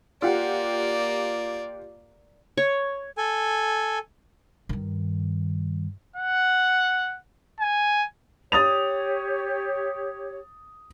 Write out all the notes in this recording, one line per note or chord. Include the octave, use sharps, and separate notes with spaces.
A#3 F4 G4 D5 F#5
C#5
A4 G#5
G2 D#3
F#5
G#5
G4 C#5 D#6 A6 F7